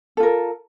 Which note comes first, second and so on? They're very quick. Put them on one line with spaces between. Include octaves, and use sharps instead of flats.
A4 F4 A#4